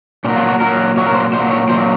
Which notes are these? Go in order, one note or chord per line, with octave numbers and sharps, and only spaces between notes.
A#2 F#3 C#4
F4
F#4
A#2 F#3 A#4
A#2 F#3 C#5
A#4
C5
A#2 F#3 C5
C#5
A#2 F#3 C5